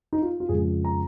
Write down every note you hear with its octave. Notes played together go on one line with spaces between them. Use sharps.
D#4
F4
F4
F2 C#3 F3 G#3 G#4
A#5